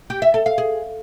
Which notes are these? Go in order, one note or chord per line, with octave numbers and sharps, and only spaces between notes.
G4
E5
A4
F5
G#4